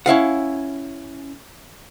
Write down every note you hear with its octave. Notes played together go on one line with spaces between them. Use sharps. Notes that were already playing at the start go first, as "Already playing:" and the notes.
C#4 E4 F5 F#5